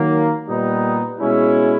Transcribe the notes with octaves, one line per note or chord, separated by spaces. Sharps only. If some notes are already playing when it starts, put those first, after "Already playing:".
Already playing: D#3 F#3 A#3
A#2 G3 B3 D#4
B2 G#3 C#4 E4